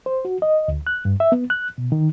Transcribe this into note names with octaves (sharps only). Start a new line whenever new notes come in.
C5
F#4
D#5
D2
F#6
G2
E5
B3
F#6
B2
D#3